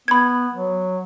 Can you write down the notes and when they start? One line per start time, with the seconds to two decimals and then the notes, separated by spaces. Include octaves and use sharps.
0.08 B3 B5 G#6
0.53 F#3